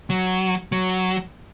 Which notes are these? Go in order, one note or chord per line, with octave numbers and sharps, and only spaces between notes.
F#3
F#3